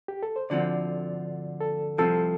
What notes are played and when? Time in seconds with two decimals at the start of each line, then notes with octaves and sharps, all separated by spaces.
0.08 G4
0.23 A4
0.36 C5
0.50 D2 D3 F3 C4 D5
1.61 A4
1.98 C2 C3 F3 A4